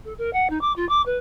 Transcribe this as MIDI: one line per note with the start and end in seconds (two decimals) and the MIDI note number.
0.04 0.13 69
0.18 0.32 70
0.33 0.47 78
0.49 0.58 63
0.61 0.72 86
0.76 0.87 65
0.89 1.02 86
1.06 1.18 71